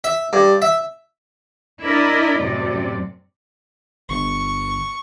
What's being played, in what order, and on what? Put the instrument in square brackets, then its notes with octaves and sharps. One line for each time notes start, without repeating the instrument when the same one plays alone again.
[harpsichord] E5
G2
E5
[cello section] D4 E4 A#4 D5 D#5
F#2 A2 C3 D5
[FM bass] G1 [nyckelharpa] C#6